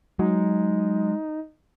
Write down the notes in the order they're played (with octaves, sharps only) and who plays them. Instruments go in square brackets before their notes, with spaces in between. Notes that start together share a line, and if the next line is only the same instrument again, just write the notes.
[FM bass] F#3 [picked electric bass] G#3 [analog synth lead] D#4